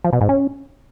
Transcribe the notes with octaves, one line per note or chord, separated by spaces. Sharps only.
F3
B2
G#2
C#4